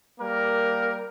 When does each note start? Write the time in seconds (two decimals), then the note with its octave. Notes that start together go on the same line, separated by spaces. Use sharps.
0.19 G3 A#3 A#4